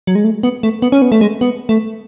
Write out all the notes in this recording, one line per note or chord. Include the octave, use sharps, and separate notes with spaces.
F#3
G#3
A3
B3
A3
B3
C#4
B3
A3
G#3
B3
A3